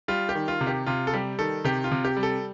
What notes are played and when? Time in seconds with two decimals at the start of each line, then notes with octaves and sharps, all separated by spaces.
0.08 G3 F4
0.29 G4
0.35 D#3
0.48 F4
0.61 C3
0.67 G4
0.86 C3 F4
1.07 A4
1.13 G3 G4
1.39 D#3 A4
1.64 C3 G4
1.84 F4
1.92 C3
2.05 G4
2.17 G3
2.23 A4